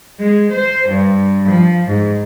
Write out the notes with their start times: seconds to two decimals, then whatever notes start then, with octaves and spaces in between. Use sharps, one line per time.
0.22 G#3
0.54 C5
0.87 G2
1.51 F3
1.88 G#2